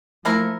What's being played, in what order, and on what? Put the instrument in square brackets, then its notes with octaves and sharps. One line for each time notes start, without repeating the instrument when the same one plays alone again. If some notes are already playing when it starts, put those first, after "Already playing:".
[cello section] F3 A3 [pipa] A#3 E4 A#4